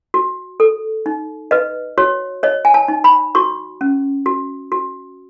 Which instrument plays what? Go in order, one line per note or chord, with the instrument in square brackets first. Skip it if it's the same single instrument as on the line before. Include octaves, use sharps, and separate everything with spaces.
[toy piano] F#4
A4
D#4
B4 D#5
F#4 C#5
C#5 D#5
G#5
A5
D#4
B5
F#4 C#6
C#4
F#4
F#4